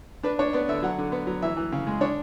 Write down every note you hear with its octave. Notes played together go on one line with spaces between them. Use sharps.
D4 B4
D4 C#5
B3 D5
D3 E5
F#3 F#5
D3
B3
F#3
E3 E5
E3
C#3
G#3
D4 C#5